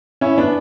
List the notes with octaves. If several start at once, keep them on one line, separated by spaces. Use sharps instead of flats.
C#4 E4
B3 D4